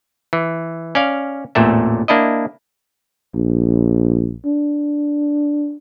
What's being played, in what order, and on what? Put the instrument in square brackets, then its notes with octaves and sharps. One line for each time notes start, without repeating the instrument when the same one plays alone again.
[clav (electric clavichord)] E3
C#4 D5 F5
A1 E2 A#2 A3 E5
A#3 D4 E4 D#5
[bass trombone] A#1
D4